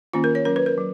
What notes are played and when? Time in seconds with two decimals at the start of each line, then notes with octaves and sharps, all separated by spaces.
0.13 D#3 A#3 C#4 F4
0.24 A#4
0.35 C#5
0.45 F#3 C#4 A#4
0.56 B4
0.66 A#4
0.78 F#3